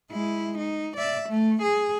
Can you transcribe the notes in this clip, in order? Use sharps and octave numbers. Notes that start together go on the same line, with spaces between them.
G#3 E4
D#4
D5 E5
A3
G#4